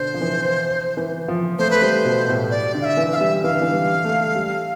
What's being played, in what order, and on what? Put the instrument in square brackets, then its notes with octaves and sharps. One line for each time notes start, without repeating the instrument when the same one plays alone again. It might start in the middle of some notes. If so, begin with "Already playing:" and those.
Already playing: [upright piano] B2 D3 [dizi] C5
[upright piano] F3
E3
E3
F3
[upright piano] A3 [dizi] C5
[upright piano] A3 [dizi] B4
[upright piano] G3 [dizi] C5
[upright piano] B2
A2
[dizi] D5
[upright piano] D3
[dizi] F5
E5
[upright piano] E3
[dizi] F5
[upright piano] G3 [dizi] E5
[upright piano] E3 [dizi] F5
[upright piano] D3
E3
G3
A3
G3